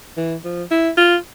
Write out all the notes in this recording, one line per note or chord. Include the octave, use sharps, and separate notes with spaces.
E3
F3
E4
F4